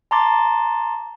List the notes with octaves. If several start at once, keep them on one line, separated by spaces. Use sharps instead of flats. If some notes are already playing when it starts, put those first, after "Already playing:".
A5 A#5 C6 D6 A6